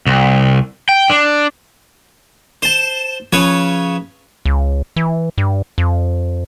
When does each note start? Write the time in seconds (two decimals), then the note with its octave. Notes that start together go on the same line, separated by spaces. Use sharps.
0.07 C2
0.89 G5
1.09 D4
2.62 C5 A5
3.33 C#3 F3 B4 C#5
4.45 C#2
4.96 E3
5.38 G2
5.78 F2